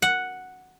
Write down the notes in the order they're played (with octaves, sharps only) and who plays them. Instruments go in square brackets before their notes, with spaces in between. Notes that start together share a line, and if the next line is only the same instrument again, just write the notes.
[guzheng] F#5